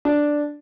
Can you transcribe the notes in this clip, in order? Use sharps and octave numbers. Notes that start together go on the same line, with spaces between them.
D4